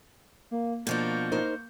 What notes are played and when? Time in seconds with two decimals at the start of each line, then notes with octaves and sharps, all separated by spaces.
0.51 A#3
0.87 B2 F3 A#3 D4 C#6 G6
1.32 D#4 A#4 C5